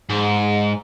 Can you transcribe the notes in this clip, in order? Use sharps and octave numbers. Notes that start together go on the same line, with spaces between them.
G#2